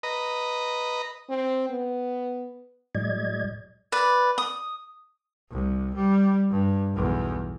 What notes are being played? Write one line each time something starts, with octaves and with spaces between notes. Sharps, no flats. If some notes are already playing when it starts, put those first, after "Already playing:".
B4 D#5 A#5
C4
B3
A2 F#3 G#3 D5 D#5 G#6
B4 D5
D#6
C2
G3
G2
B1 E2